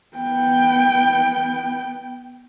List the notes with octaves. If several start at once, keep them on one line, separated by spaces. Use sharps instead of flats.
B3 G5